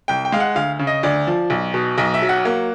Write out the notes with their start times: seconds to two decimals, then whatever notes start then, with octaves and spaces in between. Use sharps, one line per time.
0.08 C2 G5
0.25 G5
0.32 G#3 F5
0.40 F#5
0.55 D2 F5
0.79 C#3
0.87 D#5
1.03 D2 D5
1.27 F3
1.50 B1
1.74 B2
1.98 B1 D#5
2.14 E5
2.22 F#3
2.29 F#5
2.45 A#3